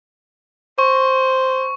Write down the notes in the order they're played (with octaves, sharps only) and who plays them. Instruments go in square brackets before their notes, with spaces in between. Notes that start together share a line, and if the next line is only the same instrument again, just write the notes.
[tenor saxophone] C5 [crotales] C#6